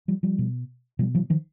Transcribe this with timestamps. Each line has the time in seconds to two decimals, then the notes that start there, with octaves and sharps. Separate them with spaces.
0.08 F3 G3
0.23 F3 G3
0.39 B2
0.99 B2 F3 G3
1.14 E3 F#3
1.30 D#3 F3